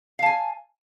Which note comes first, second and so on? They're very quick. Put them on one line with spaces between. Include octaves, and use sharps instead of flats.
F5 A5 G#5